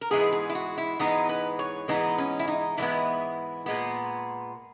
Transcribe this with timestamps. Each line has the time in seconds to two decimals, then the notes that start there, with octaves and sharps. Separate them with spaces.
0.01 A#4
0.11 G#2 E3 G#3 B3 G#4
0.33 G#4
0.50 E4
0.55 F#4
0.78 E4
0.99 G#2 E3 G#3 B3 D#4
1.29 B4
1.59 C#5
1.88 G#2 E3 G#3 B3 D#4
2.18 C#4
2.39 E4
2.48 D#4
2.77 G#2 E3 G#3 B3 E4
3.66 A#2 G#3 B3